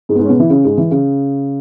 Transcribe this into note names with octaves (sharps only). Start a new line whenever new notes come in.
G#2 G#3
B3
G#2 G#3
C#4
B2 B3
E3 E4
C#3 C#4
G#2 G#3
E3
C#3